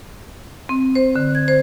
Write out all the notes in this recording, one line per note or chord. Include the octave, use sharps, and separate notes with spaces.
C4
C5
D3
G#6
C5